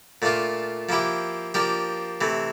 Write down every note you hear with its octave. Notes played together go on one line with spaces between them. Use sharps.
A#2 A3 D4 F4
F3 A#3 E4 G4
F3 A#3 D4 G4
C3 E3 A3